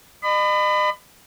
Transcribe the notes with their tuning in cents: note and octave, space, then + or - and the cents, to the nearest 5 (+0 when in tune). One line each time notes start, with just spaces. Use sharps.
D#5 -40 B5 +25